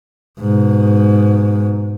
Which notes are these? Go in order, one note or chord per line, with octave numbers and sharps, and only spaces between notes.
G#2 B2